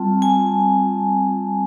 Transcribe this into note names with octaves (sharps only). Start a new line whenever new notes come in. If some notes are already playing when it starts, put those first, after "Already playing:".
Already playing: G3 C4 F4 A5
G#5